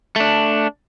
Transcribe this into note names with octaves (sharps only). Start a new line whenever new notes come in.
A3 D4